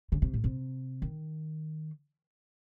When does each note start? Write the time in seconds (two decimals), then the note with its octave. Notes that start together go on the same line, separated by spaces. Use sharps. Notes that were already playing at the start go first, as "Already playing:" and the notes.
0.12 C#3
0.22 C3
0.34 A2
0.44 C3
1.02 D#3